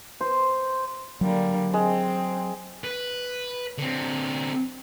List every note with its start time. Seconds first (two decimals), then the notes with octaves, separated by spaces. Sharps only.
0.21 C5
1.21 D3 F#3 G3 A#3
1.74 G#3 C4
2.84 B4
3.78 D3 C4